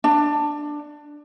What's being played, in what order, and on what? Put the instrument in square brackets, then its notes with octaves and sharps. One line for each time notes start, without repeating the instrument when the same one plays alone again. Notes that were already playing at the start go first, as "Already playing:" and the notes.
[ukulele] D4